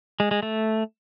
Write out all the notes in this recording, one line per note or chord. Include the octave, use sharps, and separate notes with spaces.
G#3
G#3
A3